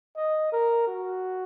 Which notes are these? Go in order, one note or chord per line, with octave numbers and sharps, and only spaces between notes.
D#5
A#4
F#4